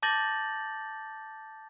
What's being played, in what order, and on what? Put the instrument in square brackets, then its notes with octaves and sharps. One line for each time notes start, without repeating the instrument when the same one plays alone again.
[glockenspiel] A5 D6 G6 A6 A#6 F#7